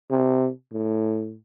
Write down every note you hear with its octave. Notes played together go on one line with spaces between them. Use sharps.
C3
A2